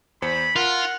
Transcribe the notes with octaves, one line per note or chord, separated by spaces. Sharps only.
E2 C5 B5 C#7
F4 A#4 F#5